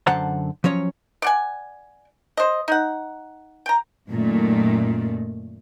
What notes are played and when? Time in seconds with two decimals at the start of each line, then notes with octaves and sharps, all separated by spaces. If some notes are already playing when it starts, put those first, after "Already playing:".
0.07 F#2 D3 C5 F#5 A5 A#5
0.64 F3 F#3 C#4 C#5
1.22 D5 F#5 G#5
2.37 C5 D#5
2.68 D#4 F#5
3.66 G5 A#5
4.10 F#2 A#2 D#3 A3